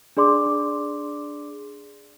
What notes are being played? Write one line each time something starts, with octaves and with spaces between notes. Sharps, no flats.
D4 G#4 D5 C6 D6